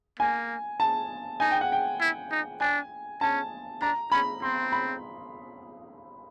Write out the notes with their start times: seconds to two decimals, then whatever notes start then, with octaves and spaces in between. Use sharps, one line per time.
0.19 A#3 G#5
0.80 A5
1.40 D#4 G#5
1.51 G5
1.61 F#5
1.72 G5
2.01 E4
2.31 D#4
2.61 D4 G#5
3.21 C#4 A5
3.82 D4 A#5
4.11 C#4 B5
4.42 C4 C6
4.72 B5